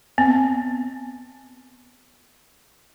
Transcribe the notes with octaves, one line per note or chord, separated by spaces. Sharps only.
B3 C4